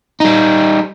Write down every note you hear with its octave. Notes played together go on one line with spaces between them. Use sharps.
G3 D#4